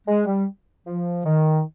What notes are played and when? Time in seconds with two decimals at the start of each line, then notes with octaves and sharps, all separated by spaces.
0.07 G#3
0.27 G3
0.87 F3
1.26 D#3